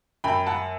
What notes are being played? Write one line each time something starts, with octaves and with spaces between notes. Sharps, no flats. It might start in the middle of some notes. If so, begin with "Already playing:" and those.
F#2 G5 B5
F#5 A5